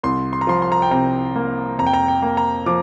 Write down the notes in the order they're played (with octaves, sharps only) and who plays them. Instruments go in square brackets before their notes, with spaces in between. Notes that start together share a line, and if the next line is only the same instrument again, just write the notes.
[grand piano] C2 C6
C6
A#5
F3 C6
C6
A#5
G5
C3 A#5
A#3
F2 A#5
G5
A#5
G5
A#3
A#5
F3 D6